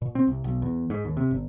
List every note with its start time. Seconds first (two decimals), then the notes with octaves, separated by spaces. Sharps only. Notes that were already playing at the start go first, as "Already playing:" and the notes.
0.02 A#2
0.15 C4
0.27 C2
0.44 B1
0.62 E2
0.90 G#2
1.05 D#2
1.17 C3
1.31 G1